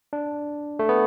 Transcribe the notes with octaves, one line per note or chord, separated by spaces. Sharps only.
D4
A3
B3